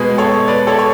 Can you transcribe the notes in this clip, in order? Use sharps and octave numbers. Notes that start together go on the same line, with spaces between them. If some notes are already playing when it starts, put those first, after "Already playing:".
Already playing: B2 G#3 G#4 B4
A4 C#5
B4 D5
A4 C#5
C#5